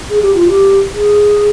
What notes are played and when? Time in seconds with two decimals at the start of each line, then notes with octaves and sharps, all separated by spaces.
0.10 G#4
0.22 G4
0.35 F4
0.48 G4
0.94 G#4